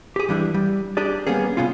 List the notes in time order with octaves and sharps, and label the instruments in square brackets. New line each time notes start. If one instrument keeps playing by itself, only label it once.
[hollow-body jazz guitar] G4 G#4
E3 G3 D4 E4
G3
D4 G4 G#4 D5
G3 A#3 B3 C#4 G#4
C3 E3 B3 C#4 F4